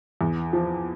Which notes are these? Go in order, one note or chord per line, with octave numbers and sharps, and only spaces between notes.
E2
F3